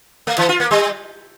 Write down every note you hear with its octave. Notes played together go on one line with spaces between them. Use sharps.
A3
E3
F4
A#3
G3